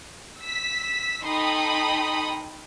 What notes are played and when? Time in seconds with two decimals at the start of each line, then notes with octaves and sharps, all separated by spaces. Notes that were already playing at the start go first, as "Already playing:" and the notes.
0.39 E6 B6
1.24 D#4 A4 G5 B5 C6 D#6